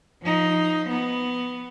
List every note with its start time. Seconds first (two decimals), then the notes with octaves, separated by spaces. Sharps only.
0.22 F3 D#4
0.89 B3